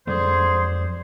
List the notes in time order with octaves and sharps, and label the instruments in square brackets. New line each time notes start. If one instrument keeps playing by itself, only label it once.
[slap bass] F2 F#3 G#3 [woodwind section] D3 G#4 C5